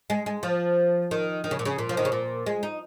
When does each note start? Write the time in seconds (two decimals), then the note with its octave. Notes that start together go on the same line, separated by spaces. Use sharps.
0.10 G#3
0.26 G#3
0.43 F3
1.11 D#3
1.44 D#3
1.51 C#3
1.59 A#2
1.65 C#3
1.78 A#2
1.89 F3
1.97 D#3
2.05 C#3
2.12 A#2
2.46 G#3
2.63 D#4